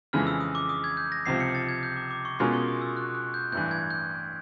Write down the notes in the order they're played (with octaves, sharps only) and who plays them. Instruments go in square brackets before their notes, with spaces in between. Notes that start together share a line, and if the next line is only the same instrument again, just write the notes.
[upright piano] F2 C#3 E3 G#3 [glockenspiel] F6
[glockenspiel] E6
D#6
D6
D#6
G#6
G6
A#6
[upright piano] C#2 C3 F3 [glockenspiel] C7
[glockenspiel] C#7
A6
G#6
G6
D6
D6
C#6
[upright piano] B2 G#3 C#4 F4 A#4 [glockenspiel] C6
[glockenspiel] C#6
D#6
E6
F#6
F#6
G6
[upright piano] A1 G2 E3 [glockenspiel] G6
[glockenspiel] G#6
G6